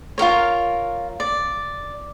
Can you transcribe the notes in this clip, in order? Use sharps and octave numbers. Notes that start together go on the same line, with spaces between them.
F4 G4 A#4 C#5
D5